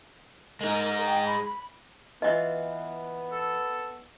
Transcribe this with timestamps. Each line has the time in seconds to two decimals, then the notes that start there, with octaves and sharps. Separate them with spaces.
0.61 G#3 D#4 A#4
1.06 G5
1.26 B5
1.43 B5
2.22 E3 B3 F4 D#5
3.32 A4